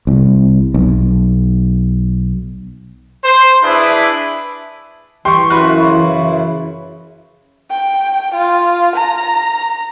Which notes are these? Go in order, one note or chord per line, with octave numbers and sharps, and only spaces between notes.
C2
B1
C5
D4 E4 G#4 B4
E3 G4 C6 C#6
F#2 C#3 E4 F#4 B4
G5
F4
A#5